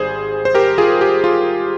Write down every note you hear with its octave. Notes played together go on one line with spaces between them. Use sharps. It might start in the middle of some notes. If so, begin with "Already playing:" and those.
Already playing: G#1 G#2 G3 G#4 C5
C5
G4 A#4
F4 G#4
G4
F4